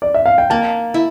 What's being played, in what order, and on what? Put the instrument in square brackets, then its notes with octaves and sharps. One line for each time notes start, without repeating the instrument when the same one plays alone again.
[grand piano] D5
E5
F5
G5
[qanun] A#3 [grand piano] A5
[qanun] E4